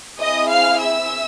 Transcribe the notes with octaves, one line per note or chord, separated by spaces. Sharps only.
C4 E4 G#4 D#5 D#6
F5 F6
E5 E6